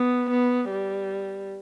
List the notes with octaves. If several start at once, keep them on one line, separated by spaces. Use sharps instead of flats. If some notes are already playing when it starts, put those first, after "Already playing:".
Already playing: B3
B3
G3